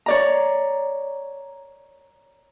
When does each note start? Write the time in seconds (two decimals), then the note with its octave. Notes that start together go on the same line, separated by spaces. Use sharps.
0.06 C#5 D5 A#5